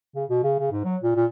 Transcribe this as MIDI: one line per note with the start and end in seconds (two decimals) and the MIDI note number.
0.15 0.25 49
0.29 0.39 47
0.43 0.56 49
0.59 0.71 49
0.71 0.84 44
0.85 0.96 54
1.03 1.14 46
1.15 1.26 46